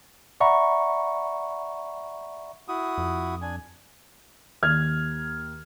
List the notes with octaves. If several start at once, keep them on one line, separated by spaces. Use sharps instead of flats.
D5 E5 F#5 A#5 B5 C#6
E4 F#4 D#6
F2
D4 G#5
D#2 F6 G#6